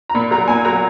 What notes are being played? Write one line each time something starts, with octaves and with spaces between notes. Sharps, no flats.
A#5
A#2 B5
F#3 A#5
A#2 G#5
F#3 A#5